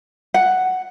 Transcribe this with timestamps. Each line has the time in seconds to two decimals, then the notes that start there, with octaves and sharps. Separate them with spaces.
0.34 F#5